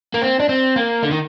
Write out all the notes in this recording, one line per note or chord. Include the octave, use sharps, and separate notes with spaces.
A#3
C4
D4
C4
A#3
D3
D#3